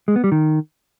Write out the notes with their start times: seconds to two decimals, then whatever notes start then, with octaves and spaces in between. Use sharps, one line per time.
0.08 G#3
0.16 B3
0.24 G3
0.32 D#3